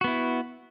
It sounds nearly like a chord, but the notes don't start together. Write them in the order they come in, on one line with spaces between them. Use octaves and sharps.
F#4 B3 E4